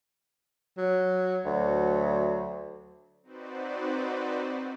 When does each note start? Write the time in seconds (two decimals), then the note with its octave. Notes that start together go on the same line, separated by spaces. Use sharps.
0.77 F#3
1.45 D2 F#3
3.23 C4 D#4 F#4 B4 C5 D5